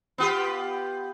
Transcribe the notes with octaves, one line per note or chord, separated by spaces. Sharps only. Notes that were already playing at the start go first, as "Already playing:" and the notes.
B3 F4 G4